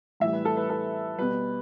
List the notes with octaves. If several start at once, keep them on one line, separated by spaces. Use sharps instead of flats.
A2 E3 G3 E5
B4
A4
B4
A4
B2 G3 B4